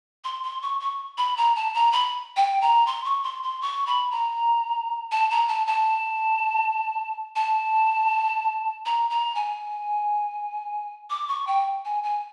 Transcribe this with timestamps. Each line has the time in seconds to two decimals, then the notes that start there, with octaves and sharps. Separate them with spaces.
0.24 C6
0.43 C6
0.62 C#6
0.80 C#6
1.17 B5
1.37 A#5
1.55 A5
1.74 A#5
1.92 B5
2.36 G5
2.61 A#5
2.86 C6
3.04 C#6
3.23 C6
3.43 C6
3.61 C#6
3.86 B5
4.11 A#5
5.11 A5
5.30 A#5
5.48 A5
5.67 A5
7.35 A5
8.85 A#5
9.10 A#5
9.35 G#5
11.10 D6
11.28 C#6
11.47 G5
11.85 G#5
12.03 G#5